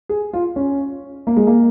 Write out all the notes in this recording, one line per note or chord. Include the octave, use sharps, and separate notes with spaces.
G#4
F4
C#4
A#3
G#3
A#3